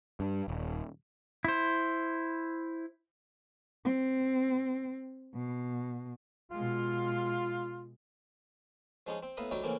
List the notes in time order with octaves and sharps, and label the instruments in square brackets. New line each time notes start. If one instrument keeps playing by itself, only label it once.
[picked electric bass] G2
D#1
[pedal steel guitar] E4 C5
[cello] C4
B2
[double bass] B2 G#3 [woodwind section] F4
[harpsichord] F3 G#3 C#4 D#4 G#4
C4
A2 B3 E5 F5 A#5 D#6
D2 F#3 G3 D#4 C#5 A#5
A2 C#3 E3 A#3 C4 C#4